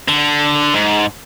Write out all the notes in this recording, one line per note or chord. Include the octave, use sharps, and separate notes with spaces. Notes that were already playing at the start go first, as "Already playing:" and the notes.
D3
G#2